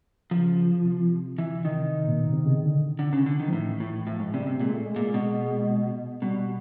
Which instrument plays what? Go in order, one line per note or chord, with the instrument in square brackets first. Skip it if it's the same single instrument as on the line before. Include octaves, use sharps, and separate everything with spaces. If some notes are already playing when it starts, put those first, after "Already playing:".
[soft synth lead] C#3 [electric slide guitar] F3
[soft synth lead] C3
[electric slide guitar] E3
D#3
[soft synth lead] A#2
B2
C3
C#3
D3
[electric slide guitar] D3
C#3
D3
D#3
[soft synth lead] F3
[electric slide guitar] A2 [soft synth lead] E3
[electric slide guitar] A2
[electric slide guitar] A2 [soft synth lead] F3
[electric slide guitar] G#2
[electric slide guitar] C3 [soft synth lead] G3
[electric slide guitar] C3
[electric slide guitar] A#2 [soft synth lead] G#3
[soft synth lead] A3
G#3
[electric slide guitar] A#2
B2
[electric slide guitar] B2 [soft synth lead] G3